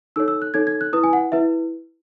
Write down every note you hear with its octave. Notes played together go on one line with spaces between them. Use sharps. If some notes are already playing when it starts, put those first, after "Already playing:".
D#4 A4 C#5 E6
E6
F#6
D#4 A4 C#5 G#6
G#6
F#6
E4 B4 D#6
G#5
F#5
E4 B4 E5